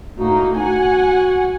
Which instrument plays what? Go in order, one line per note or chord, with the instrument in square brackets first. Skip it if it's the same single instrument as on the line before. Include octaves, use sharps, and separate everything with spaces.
[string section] A2 A#3 D#4 [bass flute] F#4
[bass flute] F#4 [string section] F#5 G#5